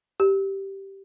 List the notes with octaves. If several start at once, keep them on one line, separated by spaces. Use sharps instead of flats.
G4